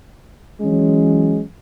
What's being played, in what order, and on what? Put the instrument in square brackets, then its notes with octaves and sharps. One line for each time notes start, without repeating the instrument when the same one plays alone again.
[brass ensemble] E3 F#3 G#3 C#4